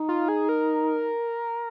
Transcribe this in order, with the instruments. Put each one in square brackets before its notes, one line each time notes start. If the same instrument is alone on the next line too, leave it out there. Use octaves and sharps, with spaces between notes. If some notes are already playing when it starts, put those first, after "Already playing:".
Already playing: [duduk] D#4
[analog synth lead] F4
G#4
A#4